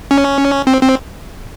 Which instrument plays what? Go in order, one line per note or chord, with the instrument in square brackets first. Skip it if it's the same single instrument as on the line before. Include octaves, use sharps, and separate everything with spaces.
[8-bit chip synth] C#4
C4
C4